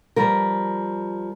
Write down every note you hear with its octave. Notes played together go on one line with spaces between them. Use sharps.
F3 G3 A#4